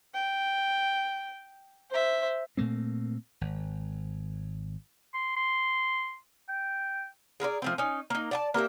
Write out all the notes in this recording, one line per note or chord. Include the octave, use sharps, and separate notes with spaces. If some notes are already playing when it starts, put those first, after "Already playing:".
G5
C5 E5
A#2 A3 A#3 C4
G#1
C6
C6
G5
G#4 A#4 B4 D5
F3 A3 C4
C#4 D#4
A#3 D#4
D5 G5 A5
A#3 G4 A#4 E5